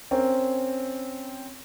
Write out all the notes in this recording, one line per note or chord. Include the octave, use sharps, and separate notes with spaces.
C4 C#4 A#4